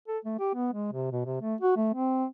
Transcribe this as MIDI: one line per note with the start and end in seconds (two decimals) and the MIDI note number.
0.08 0.18 69
0.25 0.36 57
0.39 0.53 67
0.54 0.70 59
0.73 0.92 56
0.93 1.09 48
1.11 1.23 47
1.25 1.39 48
1.42 1.56 57
1.61 1.74 66
1.77 1.91 57
1.94 2.25 60